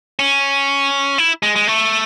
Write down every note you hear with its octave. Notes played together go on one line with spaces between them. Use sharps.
C#4
E4
G#3
G#3
A3